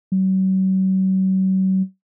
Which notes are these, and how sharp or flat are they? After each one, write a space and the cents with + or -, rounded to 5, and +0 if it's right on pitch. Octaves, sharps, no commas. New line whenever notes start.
F#3 +40